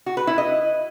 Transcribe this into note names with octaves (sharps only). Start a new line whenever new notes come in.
F#4
B4
E4
D#5